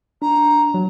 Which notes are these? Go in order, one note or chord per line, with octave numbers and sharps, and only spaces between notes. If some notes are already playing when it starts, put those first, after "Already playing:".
D4 A#5
F#3